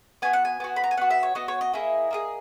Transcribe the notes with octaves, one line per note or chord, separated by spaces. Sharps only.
B3 F#4 G#5
F#5
G#5
B3 F#4
B5
A#5
G#5
B3 F#4 F#5
E5
C#5
B3 F#4 D#5
C#5
D#5
A#3 E4 G#4
A#3 E4 G#4